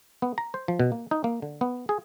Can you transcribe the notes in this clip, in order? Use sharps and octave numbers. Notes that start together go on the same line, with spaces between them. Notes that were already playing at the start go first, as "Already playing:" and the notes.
B3
A#5
C5
F3
B2
A#3
D#4
A#3
D3
B3
G#4